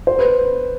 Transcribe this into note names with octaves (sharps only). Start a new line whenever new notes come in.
C5
B4